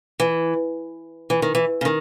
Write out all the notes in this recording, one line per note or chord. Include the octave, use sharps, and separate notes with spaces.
E3
E3
D#3
E3
C#3
D#3